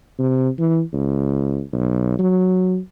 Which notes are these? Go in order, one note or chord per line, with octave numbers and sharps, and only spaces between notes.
C3
E3
C#2
B1
F#3